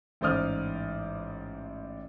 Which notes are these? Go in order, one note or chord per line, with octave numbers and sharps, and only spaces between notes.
A1 G#2 C5 D5 D#6 F6